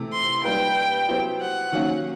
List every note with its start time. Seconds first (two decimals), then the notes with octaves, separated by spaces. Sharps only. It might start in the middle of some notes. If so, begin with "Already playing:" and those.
Already playing: C3 E3 A3
0.13 C6
0.44 G3 A#3 D#4 G4 B4 G5
1.08 F#3 B3 E4 G4 C5
1.40 F#5
1.72 D#3 F#3 A#3 C#4